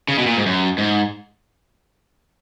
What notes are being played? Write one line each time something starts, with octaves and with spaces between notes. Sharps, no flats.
C#3
B2
A#2
G#2
F#2
G#2